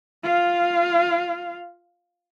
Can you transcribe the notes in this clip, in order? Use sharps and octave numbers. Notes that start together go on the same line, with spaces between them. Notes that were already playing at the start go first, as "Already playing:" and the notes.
F4 F5